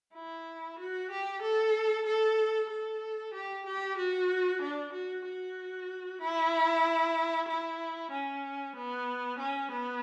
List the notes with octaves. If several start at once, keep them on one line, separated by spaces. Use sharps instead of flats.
E4
F#4
G4
A4
A4
A4
G4
G4
F#4
D4
F#4
F#4
E4
E4
C#4
B3
C#4
B3